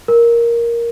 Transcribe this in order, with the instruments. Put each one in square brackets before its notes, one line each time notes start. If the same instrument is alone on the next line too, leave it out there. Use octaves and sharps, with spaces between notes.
[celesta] A#4